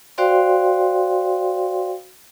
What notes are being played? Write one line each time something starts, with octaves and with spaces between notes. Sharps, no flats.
F#4 C5 D5 F5 G5 C6